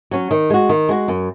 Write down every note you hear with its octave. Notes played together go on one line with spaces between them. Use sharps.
F#3 C#4
D#3
G#3 F#4
D#3
G#3 F#4
F#2